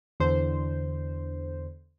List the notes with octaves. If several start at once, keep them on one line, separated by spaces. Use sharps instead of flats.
E2 D3 C5